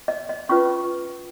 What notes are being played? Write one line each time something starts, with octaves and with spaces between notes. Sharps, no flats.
D#5
D#5
C#4 F4 B4 C#6